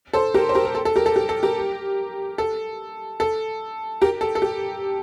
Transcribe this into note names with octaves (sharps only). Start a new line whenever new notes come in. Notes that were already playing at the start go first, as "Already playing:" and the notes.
A4 C5
G4 A#4
C5
G4 A#4
A#4
A4
A4
G4 A#4
A4
G4
A4
G4 A#4
A4
A4
G4 A#4
A4
A4
G4